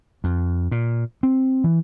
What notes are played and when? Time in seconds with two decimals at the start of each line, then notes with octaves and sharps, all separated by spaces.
0.24 F2
0.71 A#2
1.23 C4
1.64 E3